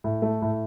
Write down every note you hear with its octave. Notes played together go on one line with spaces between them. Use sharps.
A2
A3
A2